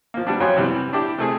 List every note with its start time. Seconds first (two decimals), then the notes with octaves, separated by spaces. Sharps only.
0.14 F3 A#3
0.27 G3 B3 D4
0.40 F2 F#3 C#5 G#5 C6
0.57 C3 E3 G3 B3
0.93 D4 E4 G4
1.18 C3 A3 G#4